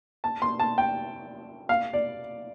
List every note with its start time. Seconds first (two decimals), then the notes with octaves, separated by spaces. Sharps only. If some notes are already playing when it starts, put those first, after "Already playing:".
0.24 A5
0.42 C6
0.60 A5
0.78 G5
1.69 F5
1.93 D5